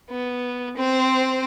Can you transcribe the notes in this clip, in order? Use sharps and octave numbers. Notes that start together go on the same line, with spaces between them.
B3
C4 C5